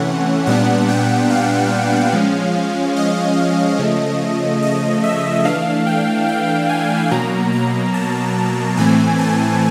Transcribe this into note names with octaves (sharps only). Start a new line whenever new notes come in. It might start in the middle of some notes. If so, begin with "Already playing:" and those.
Already playing: C3 E3 A3 C#4 F#5
A#2 G3 B3 D4 F#5
G5
F5
F3 G#3 C#4
D#5
C#3 F3 A3
D#5
E5
E3 A3 D4 F5
G5
G5
G#5
B2 F#3 A#3 A#5
A#5
A5
A2 E3 A3 C4 G#5
A5